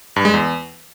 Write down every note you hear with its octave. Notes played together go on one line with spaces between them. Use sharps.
G2
G#3
E2